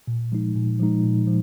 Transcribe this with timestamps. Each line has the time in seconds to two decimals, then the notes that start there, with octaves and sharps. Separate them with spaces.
0.07 A#2
0.32 F3 G#3 D#4
0.55 A#2
0.80 F3 G#3 D#4
1.03 A#2
1.27 F3